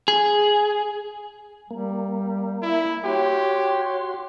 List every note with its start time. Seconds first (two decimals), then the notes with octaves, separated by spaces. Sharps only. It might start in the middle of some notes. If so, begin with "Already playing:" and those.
0.08 G#4
1.71 G3 A#3
2.62 E4
3.05 F#4 G4 C#5 C6